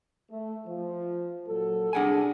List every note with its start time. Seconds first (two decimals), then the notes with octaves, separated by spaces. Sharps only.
0.31 A3
0.67 F3
1.48 A#2 F#3 A4
1.93 C2 D4 G#4 F#5 G#5